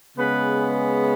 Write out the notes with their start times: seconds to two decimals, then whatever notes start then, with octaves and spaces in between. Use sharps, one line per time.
0.17 C#3 G#3 B3 B4